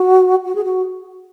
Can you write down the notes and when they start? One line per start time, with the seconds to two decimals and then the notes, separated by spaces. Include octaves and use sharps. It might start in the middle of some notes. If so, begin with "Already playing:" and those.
Already playing: F#4
0.45 F#4
0.55 G#4
0.64 F#4